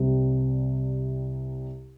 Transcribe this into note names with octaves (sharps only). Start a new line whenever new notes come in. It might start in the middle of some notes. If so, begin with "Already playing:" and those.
Already playing: C2 C3 G3